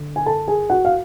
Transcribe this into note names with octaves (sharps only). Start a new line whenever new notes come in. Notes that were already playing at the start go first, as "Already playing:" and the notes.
Already playing: D3
G#5
A4 A5
G#4 G#5
F#4 F#5
F5